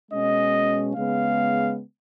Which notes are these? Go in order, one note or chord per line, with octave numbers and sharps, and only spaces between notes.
B2 G#3 C#4 D#5
C#3 G#3 B3 F5